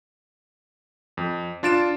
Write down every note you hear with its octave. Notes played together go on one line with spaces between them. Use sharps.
F2
D4 F4 A6 D7 E7